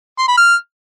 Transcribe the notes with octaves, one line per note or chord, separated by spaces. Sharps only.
C6
B5
F6